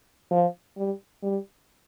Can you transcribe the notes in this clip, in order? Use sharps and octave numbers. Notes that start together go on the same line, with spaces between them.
F3
G3
G3